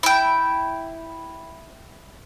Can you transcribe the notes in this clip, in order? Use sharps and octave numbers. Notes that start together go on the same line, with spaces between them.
E4 G5